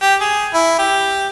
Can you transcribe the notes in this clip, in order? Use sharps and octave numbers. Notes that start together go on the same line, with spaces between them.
G4
G#4
E4
G4